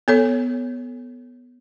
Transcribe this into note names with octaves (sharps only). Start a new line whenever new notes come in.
B3 A4 C#5